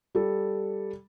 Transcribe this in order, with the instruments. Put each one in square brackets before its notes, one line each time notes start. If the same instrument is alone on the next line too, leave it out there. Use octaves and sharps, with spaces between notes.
[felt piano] G3 A4